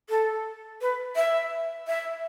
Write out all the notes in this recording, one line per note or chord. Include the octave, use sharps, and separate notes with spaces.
A4
B4
E5
E5